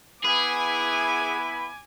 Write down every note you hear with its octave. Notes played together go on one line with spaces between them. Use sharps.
B3 E4 G#4 G#5 B5 D6